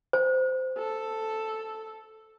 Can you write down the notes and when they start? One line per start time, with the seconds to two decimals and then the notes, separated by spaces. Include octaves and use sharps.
0.13 C5
0.78 A4